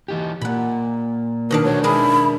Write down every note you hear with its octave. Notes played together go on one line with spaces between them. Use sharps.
E3 D#4 G4
A#2 A#3 F#5 B5
B2 D#3 D4 A#4
A3 F#4 C5 C#5
G#3 D4 G#4 A#4 E5 B5